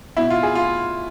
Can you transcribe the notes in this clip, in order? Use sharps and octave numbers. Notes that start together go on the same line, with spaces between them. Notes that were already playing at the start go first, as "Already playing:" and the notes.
B2 E4
F4
G#4
F4